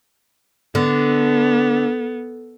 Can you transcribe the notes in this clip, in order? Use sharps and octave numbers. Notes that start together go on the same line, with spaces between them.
D3 B3